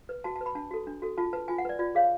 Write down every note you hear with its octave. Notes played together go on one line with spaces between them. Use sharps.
B4
F#4 A5
A5
B4
B5
D4 A5
F#4 A4
D4
F#4 A4
F4 A5
B4 A5
F4 G#5
F#5
B4 D5
F4 D5
G#4 C#5 F5